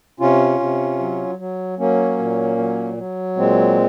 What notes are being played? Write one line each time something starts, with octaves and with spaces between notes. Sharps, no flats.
C3 C#4 F4
C3
F#3
F#3
F#3 A#3 C#4
A#2
F#3
F#3
A#2 G#3 C4